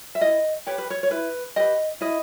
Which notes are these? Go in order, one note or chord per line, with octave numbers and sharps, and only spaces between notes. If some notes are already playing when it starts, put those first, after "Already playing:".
E5
E4 D#5
G4 B4 C#5
B4
C#5
C#5
E4 B4
G4 B4 D#5
E4 D#5